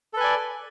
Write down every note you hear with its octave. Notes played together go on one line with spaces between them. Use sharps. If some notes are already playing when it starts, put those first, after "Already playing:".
A4 B4 D5 G#5